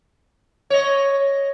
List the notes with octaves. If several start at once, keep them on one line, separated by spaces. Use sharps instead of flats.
C#5 D#5